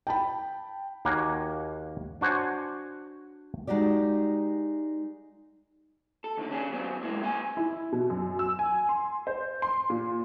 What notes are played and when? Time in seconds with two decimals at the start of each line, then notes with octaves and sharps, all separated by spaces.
0.07 G5 A5 B5
1.05 D#2 A#3 F#4 C#5 G#5
2.21 D4 F#4 C5 C#5 G#5
3.67 G#3 D#4 F#4 G4 D5
6.24 A4
6.37 D#2 D3 D#3
6.51 C#4 D4 G#4
6.72 F#3 B3 C4
7.02 E2 G#3 A#3 E4
7.22 C2 C4 F#5 G#5
7.57 E4
7.92 B2
8.10 F#2
8.39 E6
8.59 G#5
8.89 C6
9.27 C5
9.62 C6
9.90 A#2